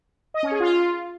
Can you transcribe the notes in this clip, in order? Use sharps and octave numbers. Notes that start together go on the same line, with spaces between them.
D#5
C#4
G#4
F4